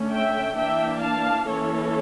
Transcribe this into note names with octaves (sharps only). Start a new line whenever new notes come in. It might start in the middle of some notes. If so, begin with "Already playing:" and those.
Already playing: D3 A3 C#4
E5 G5
E3 A#3 D4 E5 G5
F5 A5
E3 A#3 C#4 A4 C#5